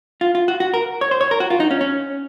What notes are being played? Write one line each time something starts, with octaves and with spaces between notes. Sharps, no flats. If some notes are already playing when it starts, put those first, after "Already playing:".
F4
F4
F#4
F#4
A#4
C#5
C5
C#5
A#4
F#4
F4
D#4
C#4
C#4